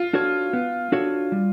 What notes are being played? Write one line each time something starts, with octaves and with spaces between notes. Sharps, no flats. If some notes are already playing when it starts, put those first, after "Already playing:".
Already playing: F4
D4 F#4 A4 C#5
B3
D4 F#4 A4 C#5
G3